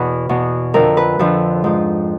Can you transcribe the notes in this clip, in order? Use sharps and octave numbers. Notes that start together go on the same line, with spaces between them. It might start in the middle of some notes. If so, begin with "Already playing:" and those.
Already playing: E2 B2 B4
E2 B2
F2 D3 F3 A#4
B4
F2 D3 F3
G#2 F3